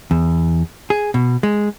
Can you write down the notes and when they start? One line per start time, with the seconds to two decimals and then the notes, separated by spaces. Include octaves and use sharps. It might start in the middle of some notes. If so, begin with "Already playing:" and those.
0.11 E2
0.90 G#4
1.14 B2
1.43 G#3